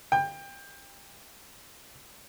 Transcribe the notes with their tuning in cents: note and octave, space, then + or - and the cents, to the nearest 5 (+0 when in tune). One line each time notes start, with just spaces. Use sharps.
G5 +25